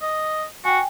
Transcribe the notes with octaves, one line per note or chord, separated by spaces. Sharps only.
D#5
F#4 G5 G#5